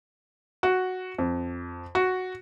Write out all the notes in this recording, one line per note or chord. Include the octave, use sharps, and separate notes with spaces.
F#4
F2
F#4